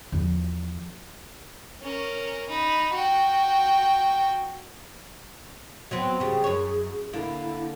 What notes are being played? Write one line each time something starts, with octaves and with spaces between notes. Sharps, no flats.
E2 F3
C#4 A#4
D#4 B5
F#4 G5
F#3 B3 C4
C#3 G3 G#4
F#2 C#5
D3 A#3 E4